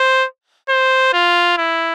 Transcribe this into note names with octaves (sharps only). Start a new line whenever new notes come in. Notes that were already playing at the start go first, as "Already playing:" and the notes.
Already playing: C5
C5
F4
E4